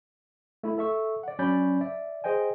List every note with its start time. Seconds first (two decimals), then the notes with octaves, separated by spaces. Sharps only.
0.63 A3 E4
0.78 A4 E5 C#6 E6
1.23 D5 F#5
1.39 F#3 C#4 D5 B5 G6
1.81 D5 E5
2.24 G#4 C5 D#5 G5 G#5